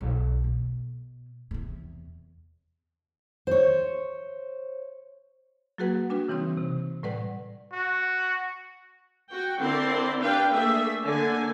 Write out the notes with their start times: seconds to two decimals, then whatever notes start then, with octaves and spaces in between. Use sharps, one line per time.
0.01 B1
0.44 B2
1.51 E2 C3
3.47 C5 C#5
5.78 F#3 A#3 F#4 G#4 B4 F#5
6.10 G3 D4 F#4 B4
6.28 C#3 E3 G3 C4 D#4
6.57 C3
7.03 A2 G3 B4 D5 F#5
7.73 F#4
9.31 F#4 G5
9.60 D3 C4 E4 A#4 D5 C6
10.22 D4 G4 B4 F5 G5
10.51 A3 A#3 D4 G#4 E5
11.04 D3 A#3 G#5